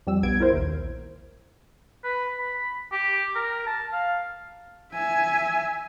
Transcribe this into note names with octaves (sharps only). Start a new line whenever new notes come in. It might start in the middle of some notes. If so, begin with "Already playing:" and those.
F2 G3 E6
B1 B3 G#6 D7
E4 A#4 C5
A#1 D#2
B4
B5
G4
A#4
A5
F5
E5 G#5